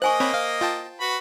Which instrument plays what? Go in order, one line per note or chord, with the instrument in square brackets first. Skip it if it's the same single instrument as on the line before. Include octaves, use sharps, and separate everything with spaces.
[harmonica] A#3 D#5 [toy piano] C5 G#5 C#6 [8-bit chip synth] F#6
[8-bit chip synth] C4 C#5 B5 [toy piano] C5
[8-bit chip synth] F5
F4 G5 A5
[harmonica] F#4 B4 B5